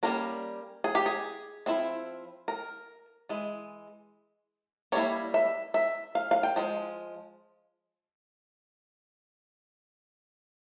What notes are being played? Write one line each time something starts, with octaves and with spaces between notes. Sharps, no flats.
G3 A#3 C#4 A#4
G#4
G4
G#4
F3 C4 E4
A#4
E3 G#3
G3 A#3 E4 C#5
E5
E5
F5
F5
G5
F3 G#3